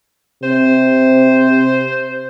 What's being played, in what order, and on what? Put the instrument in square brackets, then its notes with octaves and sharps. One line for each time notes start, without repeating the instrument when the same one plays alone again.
[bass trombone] C3 [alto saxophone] C5